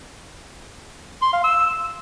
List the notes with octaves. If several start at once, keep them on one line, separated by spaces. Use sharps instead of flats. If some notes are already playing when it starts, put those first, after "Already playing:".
C6
F5
E6